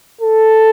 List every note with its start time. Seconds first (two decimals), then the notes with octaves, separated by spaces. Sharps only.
0.21 A4